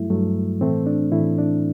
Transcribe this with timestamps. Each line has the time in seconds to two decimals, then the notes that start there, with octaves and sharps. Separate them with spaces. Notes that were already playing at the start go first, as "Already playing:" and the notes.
Already playing: G2 F#3 A3 E4
0.10 G2 F#3 A3
0.61 A2 E3 A3 C4
0.86 D4
1.12 A2 E3 A3 E4
1.38 D4